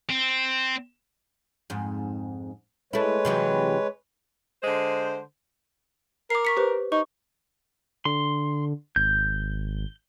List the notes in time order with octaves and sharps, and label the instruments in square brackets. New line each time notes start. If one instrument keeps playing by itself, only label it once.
[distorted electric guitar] C4
[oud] F2 G#2
[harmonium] G#3 B4 C#5 [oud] A3 E4
[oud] C3 E3 F#3
[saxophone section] D3 G#3 C5
[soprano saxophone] A#4 [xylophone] D6 C7
[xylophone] C#6 B6 C#7
G4 B4 C5
[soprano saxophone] D#4 [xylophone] C#6
[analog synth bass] D3 [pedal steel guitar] C6
[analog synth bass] G#1 [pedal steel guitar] G6